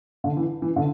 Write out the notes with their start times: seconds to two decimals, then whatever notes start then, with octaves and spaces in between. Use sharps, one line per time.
0.24 D3
0.37 E3
0.62 E3
0.76 D3